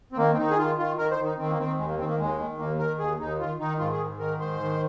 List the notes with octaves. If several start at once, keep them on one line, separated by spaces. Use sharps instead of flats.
C4
D#3 A#3
C4
D#3 D#4
G#4
D#3 F4
D#3 F4
D#3 A#4
C5
D#3
D#4
D#3 C4
A#3
D#3 C4
D#2 G#3
A#3
D#3 C4
A#3
D#2 G#3
D#3
D#2 A#3
D#3 A#4
D#2 G#4
D#2 D#4
D#3 F4
D#3 D#4
G#2 F4
G#4
G#2
D#3 A#4
G#2 C5
D#3